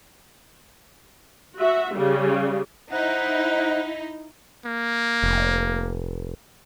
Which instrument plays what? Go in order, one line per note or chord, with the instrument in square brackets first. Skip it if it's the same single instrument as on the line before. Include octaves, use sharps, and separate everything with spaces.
[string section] F#4 E5
C#3 G3
[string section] D#4 [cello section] E4 [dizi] C5 [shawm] F#5
[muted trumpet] A#3
[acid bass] F1